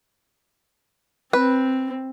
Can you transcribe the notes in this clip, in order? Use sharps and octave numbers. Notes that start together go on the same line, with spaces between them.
C4 B4